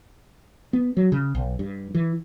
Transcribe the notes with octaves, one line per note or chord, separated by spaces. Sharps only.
B3
F#3
C#3
B1
G2
E3